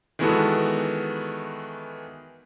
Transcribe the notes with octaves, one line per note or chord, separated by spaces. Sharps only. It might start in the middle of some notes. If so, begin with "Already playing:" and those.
D#3 E3 G#3 B3 F#4 A4